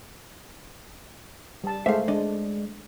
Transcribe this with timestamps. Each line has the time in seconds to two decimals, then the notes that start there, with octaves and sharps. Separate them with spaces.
1.64 G3 A5
1.86 G#3 A3 C5 E5 F5
2.08 G#3 D4 D5 D#5